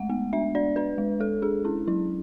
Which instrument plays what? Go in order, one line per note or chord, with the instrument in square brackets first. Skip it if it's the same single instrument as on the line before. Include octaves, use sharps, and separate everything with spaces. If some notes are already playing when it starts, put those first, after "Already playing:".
Already playing: [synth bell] G#3 A3 F#5
B3
D4 E5
D4 D5
D4 B4
G#3
G#3 A4
D4 G#4
C#4 E4
F#3 E4